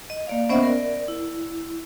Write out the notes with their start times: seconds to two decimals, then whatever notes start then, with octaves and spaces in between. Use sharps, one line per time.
0.10 D#5
0.27 A#3 D5 F5
0.49 B3 C#4 C5 D#5 E5 F#5
0.63 A#4 D5
1.08 E4